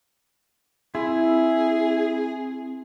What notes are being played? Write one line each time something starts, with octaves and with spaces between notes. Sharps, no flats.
C4 E4 G#4